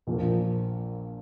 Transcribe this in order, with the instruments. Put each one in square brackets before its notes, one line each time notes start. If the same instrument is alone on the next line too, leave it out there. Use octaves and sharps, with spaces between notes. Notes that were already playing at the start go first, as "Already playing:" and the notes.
[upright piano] A#1 A#2 F3 A#3